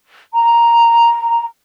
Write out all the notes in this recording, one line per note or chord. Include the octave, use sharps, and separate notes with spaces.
A#5